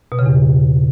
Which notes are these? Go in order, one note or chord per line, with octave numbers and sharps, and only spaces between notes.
B2
C#3
E2